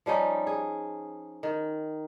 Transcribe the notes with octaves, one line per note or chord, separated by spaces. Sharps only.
F3 G3 C#4 D#4
G#4
D#3